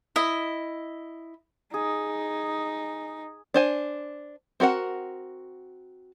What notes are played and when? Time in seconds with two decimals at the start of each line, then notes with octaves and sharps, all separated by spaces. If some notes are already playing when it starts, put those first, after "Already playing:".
0.16 E4 D#5
1.74 D#4 G#4
3.54 D4 C5 G#5
4.60 C4 F#4 A#4 F#5